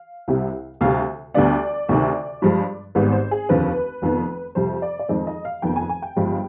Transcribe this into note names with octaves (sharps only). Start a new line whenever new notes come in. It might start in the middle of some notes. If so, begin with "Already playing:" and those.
Already playing: F5
C2 C3 G3
D2 C3 G3 F5
D2 D3 G3 B3 D5
D2 C3 D#3
G2 F3 G#3
G#1 G#2 G3 B3 B4
C5
G#4
F1 D#2 D3 F3 C4 B4
F1 F2 D#3 B3
F2 C3 G3 C5
D5
D5
F2 D#3 G#3 C4 D#5
D#5
F5
F1 F2 D#3 B3 G5
G#5
G#5
G5
G1 G2 F3 G#3